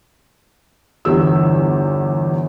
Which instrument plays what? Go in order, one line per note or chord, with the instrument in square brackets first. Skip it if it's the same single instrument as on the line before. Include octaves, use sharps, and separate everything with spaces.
[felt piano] G1 E2 G4 E6